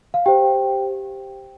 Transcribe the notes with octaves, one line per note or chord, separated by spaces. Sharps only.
F5
G4 C5 G5